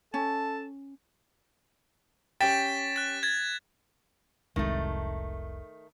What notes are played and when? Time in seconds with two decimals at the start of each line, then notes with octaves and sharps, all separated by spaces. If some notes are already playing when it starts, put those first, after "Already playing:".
0.14 C#4 A4 A5
2.41 C#4 G4 G5 A6 B6 E7
2.96 F#6 A6
3.23 G#6 A6
4.56 F1 C2 D#3 G#3 A3